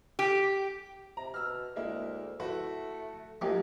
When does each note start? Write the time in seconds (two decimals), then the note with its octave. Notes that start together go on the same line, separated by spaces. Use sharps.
0.19 G4
1.17 C3 A#5
1.34 B2 E6 F6
1.76 D2 G#3 A#3 E4
2.40 A3 E4 F#4 B4
3.42 G#2 F3 F#3 A3 A#3 G4